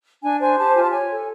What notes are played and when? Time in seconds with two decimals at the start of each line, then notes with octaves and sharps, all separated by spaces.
0.23 D4 G#5
0.40 C5 G#5
0.58 G4 A5
0.75 F4 G#5
0.83 A5
0.90 C#5 G#5
1.10 A4